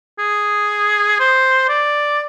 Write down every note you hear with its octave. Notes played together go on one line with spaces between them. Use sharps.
G#4
C5
D5